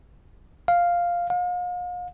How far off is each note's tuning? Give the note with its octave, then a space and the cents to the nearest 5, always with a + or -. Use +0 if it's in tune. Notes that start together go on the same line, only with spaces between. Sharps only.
F5 +0
F5 +40